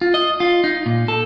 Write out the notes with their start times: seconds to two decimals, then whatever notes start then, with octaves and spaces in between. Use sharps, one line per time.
0.01 F4
0.14 D#5
0.40 F4
0.64 D#4
0.86 A#2
1.08 A4